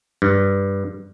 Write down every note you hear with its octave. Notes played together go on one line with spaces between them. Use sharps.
G2